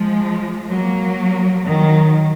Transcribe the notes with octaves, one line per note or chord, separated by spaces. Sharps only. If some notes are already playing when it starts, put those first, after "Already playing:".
Already playing: F3 G#3
F#3 A#3
D#3 F#3